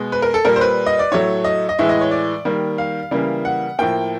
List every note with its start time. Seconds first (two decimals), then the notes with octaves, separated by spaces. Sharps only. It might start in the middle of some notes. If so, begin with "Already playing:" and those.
Already playing: B2 G#3
0.12 B4
0.22 A#4
0.34 A4
0.45 A#2 G3 A#3 A#4
0.56 C5
0.61 B4
0.86 D#5
0.99 D5
1.11 A2 F#3 A3 C#5
1.44 D#5
1.69 D#5
1.79 A2 E3 G#3 E5
1.89 D#5
2.01 C#5
2.11 D5
2.45 D#3 G3 A#3
2.78 F5
3.11 C#3 E3 G3 A#3
3.45 F#5
3.79 A2 F3 A#3 G5